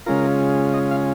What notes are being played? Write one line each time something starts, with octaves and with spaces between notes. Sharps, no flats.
C#3 G#3 C#4 F4 A#4
D#5
F5